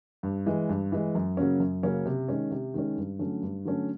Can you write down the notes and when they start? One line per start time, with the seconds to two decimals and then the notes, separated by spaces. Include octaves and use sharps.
0.23 G2
0.46 E3 G#3
0.69 G2
0.92 E3 G#3
1.15 F#2
1.37 C#3 F#3 A#3 C#4
1.60 F#2
1.83 C#3 F#3 A#3 C#4
2.06 C3
2.29 D#3 G#3 C#4
2.51 C3
2.74 D#3 G#3 C#4
2.97 G2
3.19 D3 F#3 A3 C#4
3.43 G2
3.65 D3 F#3 A3 C#4